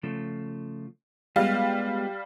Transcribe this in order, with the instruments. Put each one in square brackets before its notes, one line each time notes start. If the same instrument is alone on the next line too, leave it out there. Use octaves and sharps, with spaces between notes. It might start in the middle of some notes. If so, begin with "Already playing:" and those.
[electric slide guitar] C#3 F3 A3
[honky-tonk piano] G3 F5 [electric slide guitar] G#3 B3 F4